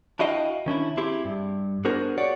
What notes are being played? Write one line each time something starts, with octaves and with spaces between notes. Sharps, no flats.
D4 E4 F#4 D#5 F5 G5
D#3 C#4 D4 E4
C4 E4 G4 G#4
G2
B3 D4 F#4 G#4 A#4 C5
G4 G#4 C#5 D5 F#5